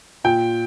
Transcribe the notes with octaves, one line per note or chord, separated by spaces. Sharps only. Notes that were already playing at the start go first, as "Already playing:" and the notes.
A#2 G5